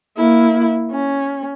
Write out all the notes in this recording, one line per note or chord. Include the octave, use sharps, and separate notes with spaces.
A#3 E4
C#4